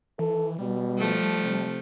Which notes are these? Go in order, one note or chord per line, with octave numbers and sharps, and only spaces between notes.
E3 A4
B2 G3
F3 A3
C3